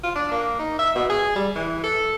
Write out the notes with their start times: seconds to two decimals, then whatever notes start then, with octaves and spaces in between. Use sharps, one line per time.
0.04 F4
0.16 D4
0.32 A#3
0.59 D#4
0.79 E5
0.95 B2
1.10 G#4
1.36 G3
1.55 E3
1.84 A4